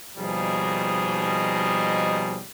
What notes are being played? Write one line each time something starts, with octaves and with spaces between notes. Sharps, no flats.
D#2 B2 F3 G3 D#4 G#4